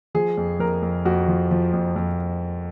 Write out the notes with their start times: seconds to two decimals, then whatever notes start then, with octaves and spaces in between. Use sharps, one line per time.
0.14 F3 G#4
0.37 F2
0.60 F2 A#4
0.83 F2
1.05 F2 F#4
1.28 F3
1.51 F3
1.73 F2
1.96 F2